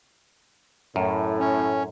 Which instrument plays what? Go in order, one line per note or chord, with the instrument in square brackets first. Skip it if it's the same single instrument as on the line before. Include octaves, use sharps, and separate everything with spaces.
[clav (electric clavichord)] F#2 [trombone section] A2
[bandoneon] C#4